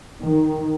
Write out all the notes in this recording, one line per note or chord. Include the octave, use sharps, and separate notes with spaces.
D#3